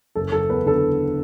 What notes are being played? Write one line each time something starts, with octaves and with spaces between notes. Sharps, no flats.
F#1 A4
F#1 A4
E2 B4
D3 A4